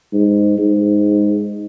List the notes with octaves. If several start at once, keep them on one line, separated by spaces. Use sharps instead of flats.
G#2
G#2